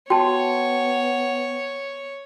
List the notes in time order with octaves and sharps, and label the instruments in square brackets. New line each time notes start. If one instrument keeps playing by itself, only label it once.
[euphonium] B3 [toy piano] F#4 [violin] C#5 [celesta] G5 A5